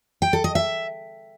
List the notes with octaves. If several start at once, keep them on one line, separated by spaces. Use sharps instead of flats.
G5
A4
D#5
E5